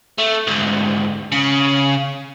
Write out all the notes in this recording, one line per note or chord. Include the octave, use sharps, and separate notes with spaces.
A3
D2 G#2
C#3